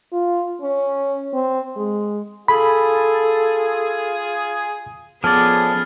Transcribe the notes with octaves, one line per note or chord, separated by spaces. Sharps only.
F4
C#4
C4
G#3
F4 G#4 A4 B5
F3 B3 C#4 G#4 A4 D5 F6 A6